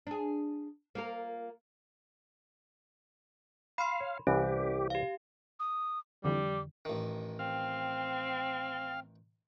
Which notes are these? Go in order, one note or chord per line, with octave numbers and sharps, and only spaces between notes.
D4 G#4
A#3 F4 A#4
F5 B5 C6
C#5
C2 E3 C#4 G4
G4 F5
D#6
F2 D3 E3 G3 D6
A1 D#3
C4 F5 G5